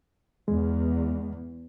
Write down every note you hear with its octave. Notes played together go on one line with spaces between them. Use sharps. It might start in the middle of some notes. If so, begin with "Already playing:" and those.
E2 G#3